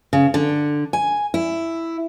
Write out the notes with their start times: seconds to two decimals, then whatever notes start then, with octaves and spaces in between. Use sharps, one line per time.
0.13 C#3
0.34 D3
0.93 G#5
1.34 E4